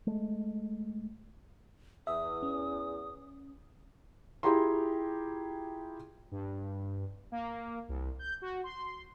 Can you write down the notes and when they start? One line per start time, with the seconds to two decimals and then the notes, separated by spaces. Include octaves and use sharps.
0.07 G#3 A3
2.07 E2 E5 D#6
2.43 C#4
4.43 E4 F4 G4 G#4 A#5 C6
6.31 G2
7.32 A#3
7.89 C2
8.19 G6
8.42 F#4
8.64 C6